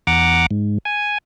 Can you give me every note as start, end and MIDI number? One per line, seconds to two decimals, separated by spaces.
0.07 0.46 40
0.07 0.46 78
0.07 0.46 82
0.07 0.46 86
0.51 0.78 44
0.85 1.18 80